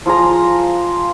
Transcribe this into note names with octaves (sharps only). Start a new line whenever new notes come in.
F3 F4 G#4 A#5